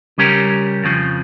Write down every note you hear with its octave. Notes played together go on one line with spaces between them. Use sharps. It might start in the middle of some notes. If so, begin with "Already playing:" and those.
C#3 G3 C#4 G4 A#4
F2 C#3 F3